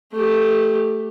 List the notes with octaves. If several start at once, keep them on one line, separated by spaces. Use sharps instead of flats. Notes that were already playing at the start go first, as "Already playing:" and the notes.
A3 G4